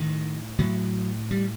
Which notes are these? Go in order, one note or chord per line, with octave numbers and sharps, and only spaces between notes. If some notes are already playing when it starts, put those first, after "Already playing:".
Already playing: A2 D#3
A2 F#3
G3